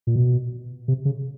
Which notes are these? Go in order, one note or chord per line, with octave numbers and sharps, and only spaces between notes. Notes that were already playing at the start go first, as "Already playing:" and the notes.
A#2
B2
C3
C#3